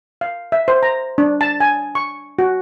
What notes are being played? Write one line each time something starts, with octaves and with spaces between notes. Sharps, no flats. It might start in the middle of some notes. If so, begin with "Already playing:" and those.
F5
E5
C5
A#5
D4
A5
G#5
C#6
F#4